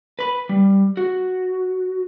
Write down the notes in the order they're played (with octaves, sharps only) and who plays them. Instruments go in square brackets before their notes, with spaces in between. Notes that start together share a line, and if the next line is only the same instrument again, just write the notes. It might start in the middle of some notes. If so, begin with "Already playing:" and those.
[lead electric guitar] B4 B5
G3
F#4